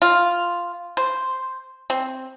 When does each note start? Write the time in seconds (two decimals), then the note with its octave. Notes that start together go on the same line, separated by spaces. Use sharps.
0.02 F4
0.97 C5
1.90 C4